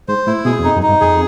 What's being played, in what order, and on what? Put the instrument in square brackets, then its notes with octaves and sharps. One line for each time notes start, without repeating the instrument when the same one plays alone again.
[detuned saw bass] G#2 [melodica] C5
[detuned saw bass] A2 [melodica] E4
[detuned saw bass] B2 [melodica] G#4
[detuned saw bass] E2
[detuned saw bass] F2 [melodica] D#4
[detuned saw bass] F#2
[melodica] D#4
[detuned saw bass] G2
[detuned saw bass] F2 [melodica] G#4